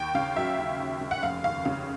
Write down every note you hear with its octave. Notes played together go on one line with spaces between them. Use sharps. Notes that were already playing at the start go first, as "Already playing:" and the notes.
Already playing: D#2 G5
C#3 F5
F#3 E5
D#2
D#2
C#3
F#5
F1 F5
D#2 F5
C#3 F5